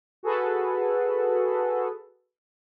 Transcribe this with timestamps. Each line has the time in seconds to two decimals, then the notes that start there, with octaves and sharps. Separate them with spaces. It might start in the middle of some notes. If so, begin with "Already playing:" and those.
0.23 F#4 G#4 A4 B4